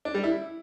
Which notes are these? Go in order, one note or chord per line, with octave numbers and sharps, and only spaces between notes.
D4
G3
E4